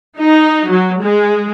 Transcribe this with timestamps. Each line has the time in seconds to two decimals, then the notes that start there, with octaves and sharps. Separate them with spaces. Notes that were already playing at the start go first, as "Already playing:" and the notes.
0.18 D#4
0.69 F#3
1.02 G#3